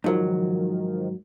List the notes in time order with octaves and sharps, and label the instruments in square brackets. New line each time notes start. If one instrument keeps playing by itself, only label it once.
[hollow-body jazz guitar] G#2 F#3 [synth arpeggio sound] D#3 F3 A#4